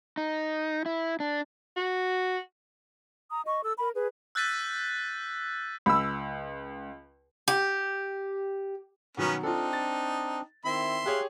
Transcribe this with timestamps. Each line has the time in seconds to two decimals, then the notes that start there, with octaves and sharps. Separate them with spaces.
0.17 D#4
0.86 E4
1.20 D4
1.76 F#4
3.31 A#5 D#6
3.45 D#5 C#6
3.64 A4 E6
3.77 A#4 B5
3.95 G#4 B4
4.35 E6 F#6 G6 A6 B6 D#7
5.86 C#2 B5 E6
7.48 G4
9.17 B2 D#3 F#3 B3 C#4 A#4
9.43 C4 D4 D#4 F4 A4
9.73 A6
10.65 D#3 C4 E4 E5 C6
11.06 G4 G#4 C#5 F5 F#6